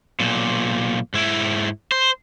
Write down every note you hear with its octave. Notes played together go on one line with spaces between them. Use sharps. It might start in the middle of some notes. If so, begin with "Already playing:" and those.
B1 A#2
G#2 E4
C5